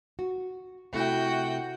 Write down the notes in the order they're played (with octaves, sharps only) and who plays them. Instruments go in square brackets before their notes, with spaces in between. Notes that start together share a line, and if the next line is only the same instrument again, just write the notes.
[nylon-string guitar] F#4
[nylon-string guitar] C3 A3 E4 [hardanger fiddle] F#4 G5